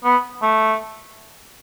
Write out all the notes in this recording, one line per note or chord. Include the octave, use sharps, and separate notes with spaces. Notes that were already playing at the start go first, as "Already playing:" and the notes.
B3
A3